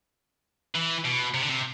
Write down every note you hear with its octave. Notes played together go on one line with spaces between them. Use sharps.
E3
B2
C3
D3
C3